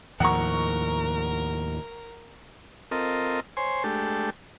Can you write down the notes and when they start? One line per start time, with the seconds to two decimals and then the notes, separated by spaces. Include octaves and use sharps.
0.20 D#2 A2 F3 A#4 F#5 A#5 C#6
2.91 C4 F4 A4 A#4 D#5
3.57 C5 C#5 G#5 C6
3.84 G#3 A3 D4 G4 A4